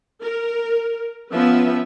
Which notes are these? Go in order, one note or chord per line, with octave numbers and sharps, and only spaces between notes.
A#4
F3 B3 C#4 B4 E5